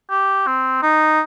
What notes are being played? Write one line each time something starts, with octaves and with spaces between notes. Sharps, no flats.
G4
C4
D#4